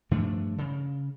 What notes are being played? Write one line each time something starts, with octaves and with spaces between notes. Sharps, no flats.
G2 F3 A3 D4
C#3